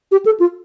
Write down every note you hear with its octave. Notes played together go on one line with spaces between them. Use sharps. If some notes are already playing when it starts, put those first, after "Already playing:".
G4
A4
F4